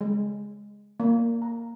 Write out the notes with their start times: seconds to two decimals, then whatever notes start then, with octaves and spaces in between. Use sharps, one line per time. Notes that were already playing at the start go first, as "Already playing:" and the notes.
0.01 G#3
1.00 A#3
1.42 A#5